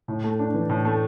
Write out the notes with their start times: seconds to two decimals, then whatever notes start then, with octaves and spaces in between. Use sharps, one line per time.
0.08 A2
0.24 A3
0.39 D4
0.54 E3
0.69 A2
0.85 A3